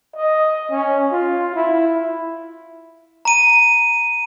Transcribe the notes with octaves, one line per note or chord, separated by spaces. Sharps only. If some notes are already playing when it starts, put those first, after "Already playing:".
D#5
C#4
F4
E4
A#5 D#7